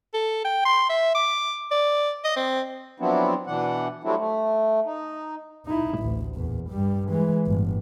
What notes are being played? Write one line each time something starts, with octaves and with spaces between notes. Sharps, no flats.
A4
G5
C6
E5
D6
D5
D#5
C4
F3 F#3 B3 C4 D4 E4
B2 E3 D4 F#5
F#3 G3 A3 C4 D4 E4
A3
D#4
D#4 E4
A1 D2
E2 A#2
G2 G3
E3 G#3
G1 A2